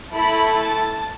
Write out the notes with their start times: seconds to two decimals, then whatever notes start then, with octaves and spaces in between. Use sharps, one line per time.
0.13 A3 E4 A4 B5
0.60 A5